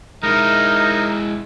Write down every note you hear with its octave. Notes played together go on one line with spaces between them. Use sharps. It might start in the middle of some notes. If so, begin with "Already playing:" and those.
G#3 D#4 E4 A#4 D#5